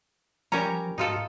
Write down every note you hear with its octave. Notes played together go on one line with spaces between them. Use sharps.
F3 G3 C#4 A#4 A#5
G#2 D#4 F4 F#4 A4